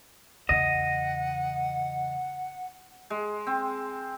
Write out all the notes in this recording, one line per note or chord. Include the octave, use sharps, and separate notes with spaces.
E2 C#3 D#5 F#5
G#3
C4